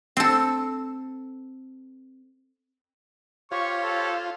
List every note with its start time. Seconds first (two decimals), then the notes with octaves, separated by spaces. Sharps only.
0.17 C4 A4
3.51 F4 G4 C5 C#5 C#6
3.83 A4